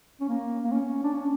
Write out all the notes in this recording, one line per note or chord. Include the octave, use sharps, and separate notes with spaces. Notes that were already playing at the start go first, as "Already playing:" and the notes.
C#4
A#3
A#3
C#4
D4
C#4